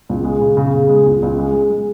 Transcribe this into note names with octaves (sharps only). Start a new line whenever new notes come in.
C#2
G#3
C#3
C#3
C#3
G#3
C#2
C#2
G#3
G#3
G#3